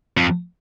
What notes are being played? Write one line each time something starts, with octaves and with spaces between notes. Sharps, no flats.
F2